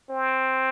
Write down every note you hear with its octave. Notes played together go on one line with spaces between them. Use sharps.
C4